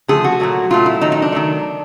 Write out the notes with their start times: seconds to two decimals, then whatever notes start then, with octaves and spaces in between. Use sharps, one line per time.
0.08 D3 F3 A3 G#4
0.24 F#4
0.40 A#2 F#3 A3
0.70 A#2 F#3 A3 F4
0.86 E4
1.01 D#3 F#3 A3 D#4
1.12 D#4
1.22 D4
1.32 D#3 F#3 A3